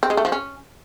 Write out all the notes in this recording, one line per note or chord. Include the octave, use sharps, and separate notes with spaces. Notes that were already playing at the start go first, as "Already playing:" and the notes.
C4
G#3
A3
F3
C#4